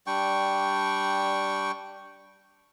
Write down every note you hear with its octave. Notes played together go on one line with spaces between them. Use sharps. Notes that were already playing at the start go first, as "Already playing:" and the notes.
G3 D4 G5 C#6